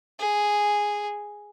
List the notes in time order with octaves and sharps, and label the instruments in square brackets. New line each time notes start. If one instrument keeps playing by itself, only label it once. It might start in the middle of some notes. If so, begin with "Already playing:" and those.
[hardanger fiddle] G#4